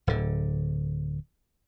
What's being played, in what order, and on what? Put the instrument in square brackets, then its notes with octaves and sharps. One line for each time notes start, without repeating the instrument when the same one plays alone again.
[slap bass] D1 D3